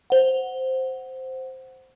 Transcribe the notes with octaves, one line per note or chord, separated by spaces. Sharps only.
C5 F#5